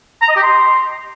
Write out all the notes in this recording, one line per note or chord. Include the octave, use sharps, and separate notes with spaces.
A#5
D#5
G4
C6